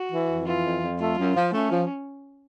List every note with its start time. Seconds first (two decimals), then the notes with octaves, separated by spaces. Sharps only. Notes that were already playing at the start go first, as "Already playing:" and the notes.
Already playing: F#4
0.11 E3
0.30 F2
0.46 E3 F4
0.64 F2
0.82 F2
1.00 A3 F4
1.17 F#2
1.34 F3
1.52 A3 C#4
1.70 F3